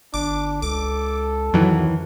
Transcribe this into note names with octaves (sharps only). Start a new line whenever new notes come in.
G1 D4 D6
C#2 A4 D6
F2 D#3 E3 F#3